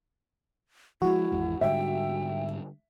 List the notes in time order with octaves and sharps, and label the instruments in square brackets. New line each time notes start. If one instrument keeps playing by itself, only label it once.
[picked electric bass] F3 G#3 [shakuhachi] E4 [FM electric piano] F#4
[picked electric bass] G#1 E2 G#3
[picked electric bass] G#2 D3 G3 [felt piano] E5 [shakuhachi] G5